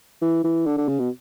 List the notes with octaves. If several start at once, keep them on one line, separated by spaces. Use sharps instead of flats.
E3
E3
D3
D3
C#3
B2